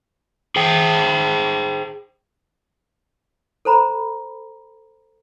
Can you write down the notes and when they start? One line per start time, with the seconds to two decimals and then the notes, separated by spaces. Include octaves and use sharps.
0.56 G#4 C5 G5
3.65 A4 C5 A#5 B5